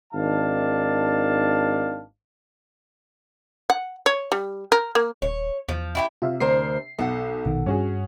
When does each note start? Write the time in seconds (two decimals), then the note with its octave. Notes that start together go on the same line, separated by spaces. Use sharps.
0.13 G#1 D#3 D4 F5 A5
3.70 F#5
4.06 C#5
4.32 G3
4.72 A#4
4.95 A#3
5.22 D#1 C#5
5.69 E2 F3
5.95 E4 F#4 G4
6.22 C3 F4 E5 F5
6.40 D2 A#4 C5 C7
6.99 B1 A4 F#5
7.45 A#1 B2 D#3
7.66 G2 C#4 F#4 G#4